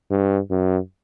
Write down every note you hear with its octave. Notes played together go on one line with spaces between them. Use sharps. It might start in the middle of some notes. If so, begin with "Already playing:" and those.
G2
F#2